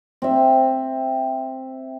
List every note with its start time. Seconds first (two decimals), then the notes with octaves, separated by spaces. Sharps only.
0.22 C4 E5